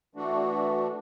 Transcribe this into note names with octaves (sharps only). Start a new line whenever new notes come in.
E3 A3 D4 F#4